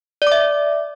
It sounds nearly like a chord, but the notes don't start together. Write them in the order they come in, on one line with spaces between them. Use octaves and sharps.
D5 D6 E5